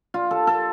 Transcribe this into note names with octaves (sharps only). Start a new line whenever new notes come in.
F4
A4
A4